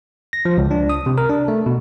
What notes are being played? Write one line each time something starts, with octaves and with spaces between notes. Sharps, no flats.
A#6
F3
C#2
D4
D#6
C3
A#4
D4
A3
B2